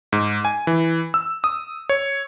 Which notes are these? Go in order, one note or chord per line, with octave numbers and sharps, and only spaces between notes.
G#2
G#5
E3
E6
D#6
C#5